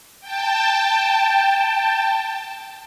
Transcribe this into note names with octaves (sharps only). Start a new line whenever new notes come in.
G5 A5